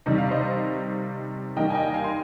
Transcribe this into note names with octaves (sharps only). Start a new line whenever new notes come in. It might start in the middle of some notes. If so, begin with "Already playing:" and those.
C3 D#3 G3 D#5
F5
C5 D#5
D#3 G3 A#3 D#5 G5
G#5
D#5 G5
F5 G#5
C6